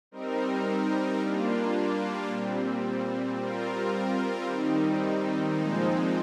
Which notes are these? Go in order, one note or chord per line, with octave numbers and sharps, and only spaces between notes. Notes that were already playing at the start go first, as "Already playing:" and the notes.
G3 C4 D#4 A#4
G3 A#3 D4 F4
A#2 G3 C4
G3 C4 F4 A#4
D#3 G3 C4 D#4
A#2 F3 G#3 C4 D#4